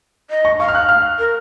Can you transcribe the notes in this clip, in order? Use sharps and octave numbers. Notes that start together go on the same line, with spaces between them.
D#5
C#6
F5 C#6
F6
F#6
F6
A#4